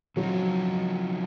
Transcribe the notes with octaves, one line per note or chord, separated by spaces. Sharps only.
C#3 F3 F#3 C4 D#4